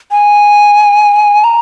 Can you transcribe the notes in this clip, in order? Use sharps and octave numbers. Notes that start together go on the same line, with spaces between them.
G#5
A#5